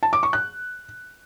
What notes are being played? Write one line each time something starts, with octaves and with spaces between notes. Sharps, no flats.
A5
D6
C#6
F#6